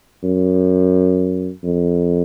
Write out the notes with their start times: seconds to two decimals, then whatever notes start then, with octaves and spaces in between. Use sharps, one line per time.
0.24 F#2
1.64 F2